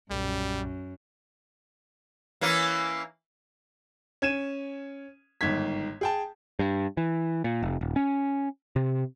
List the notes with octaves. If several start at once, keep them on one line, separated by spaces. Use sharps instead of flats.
B1 F#2 A#2 G3
E3 A#3 C#4
C#4 G#6 D#7 E7
G1 G#2 D#3 G#6 B6
G#4 G5 A5
G2
E3
A#2
F1
D#1
C#4
C3